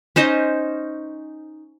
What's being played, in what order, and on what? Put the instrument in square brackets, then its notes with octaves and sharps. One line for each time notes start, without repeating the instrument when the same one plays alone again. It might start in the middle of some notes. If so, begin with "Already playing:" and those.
[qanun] C#4 D#4 C5 D#5